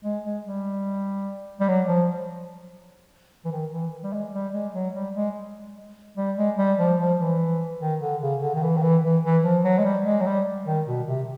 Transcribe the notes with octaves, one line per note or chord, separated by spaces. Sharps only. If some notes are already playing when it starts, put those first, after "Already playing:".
G#3
G#3
G3
G3
F#3
F3
E3
D#3
E3
G3
G#3
G3
G#3
F#3
G3
G#3
G3
G#3
G3
F3
F3
E3
D#3
D3
C#3
D3
D#3
E3
D#3
E3
E3
E3
F3
F#3
G#3
G3
G#3
F#3
G3
D#3
B2
C3